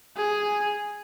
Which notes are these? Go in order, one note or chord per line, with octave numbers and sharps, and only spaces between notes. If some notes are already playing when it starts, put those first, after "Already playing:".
G#4